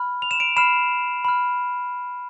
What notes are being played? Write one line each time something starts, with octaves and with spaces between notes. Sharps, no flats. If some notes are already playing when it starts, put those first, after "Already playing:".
Already playing: B5 F6
F7
E7
D7 F7
B5 F6 C7 E7
B5 F6